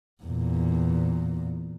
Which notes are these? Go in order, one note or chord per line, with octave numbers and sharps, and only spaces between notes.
E2 A#2